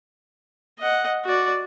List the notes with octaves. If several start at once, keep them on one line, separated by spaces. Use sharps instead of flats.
D#5 F#5
F#4 D5